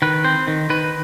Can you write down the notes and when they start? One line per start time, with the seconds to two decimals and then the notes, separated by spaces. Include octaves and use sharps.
0.02 D#3 B4
0.24 C4 C5
0.47 D#3
0.70 D#3 B4